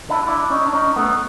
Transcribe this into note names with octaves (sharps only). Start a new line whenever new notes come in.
D4 E4
D4 E4
C#4 D#4
D4
C#4 D#4
A3 B3